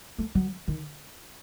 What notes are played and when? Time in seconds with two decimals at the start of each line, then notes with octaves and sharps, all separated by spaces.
0.19 A3
0.35 F#3
0.68 D#3